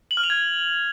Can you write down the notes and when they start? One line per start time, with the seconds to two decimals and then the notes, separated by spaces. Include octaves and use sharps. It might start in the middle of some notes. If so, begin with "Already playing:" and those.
0.11 F#7
0.17 F6
0.24 F7
0.30 G#6